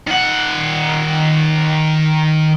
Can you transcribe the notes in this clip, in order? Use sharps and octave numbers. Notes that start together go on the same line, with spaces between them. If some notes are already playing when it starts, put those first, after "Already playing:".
D#3 F#5